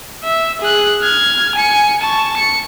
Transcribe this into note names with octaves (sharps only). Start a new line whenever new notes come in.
E5
G#4 F#6
F6 G#6
G#5 C#7
A5 C#6
C#7